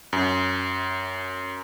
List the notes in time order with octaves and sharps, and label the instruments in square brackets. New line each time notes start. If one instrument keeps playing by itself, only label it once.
[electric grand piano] F#2